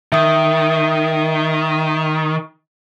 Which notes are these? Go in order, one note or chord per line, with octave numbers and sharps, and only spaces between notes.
D#3 E5 D#6